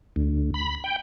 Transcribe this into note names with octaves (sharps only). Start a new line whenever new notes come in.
D2
B5
G5